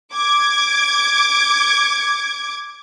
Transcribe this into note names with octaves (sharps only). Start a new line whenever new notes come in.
D6 G#6